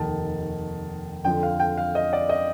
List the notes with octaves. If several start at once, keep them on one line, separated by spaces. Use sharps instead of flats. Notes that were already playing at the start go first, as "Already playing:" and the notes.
Already playing: F1 D#2 D#3 A5
F2 D3 F3 G5
F5
G5
F5
D#5
D5
D#5